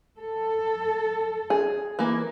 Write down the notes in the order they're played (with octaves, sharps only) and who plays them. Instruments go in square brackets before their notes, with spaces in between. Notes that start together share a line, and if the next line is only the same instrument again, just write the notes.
[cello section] A4
[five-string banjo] G#4
E3 A#3